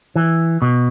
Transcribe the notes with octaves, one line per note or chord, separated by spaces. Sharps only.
E3
B2